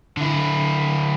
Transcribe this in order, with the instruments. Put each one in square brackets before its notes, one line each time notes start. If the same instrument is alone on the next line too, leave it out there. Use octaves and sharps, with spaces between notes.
[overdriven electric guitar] D3 E4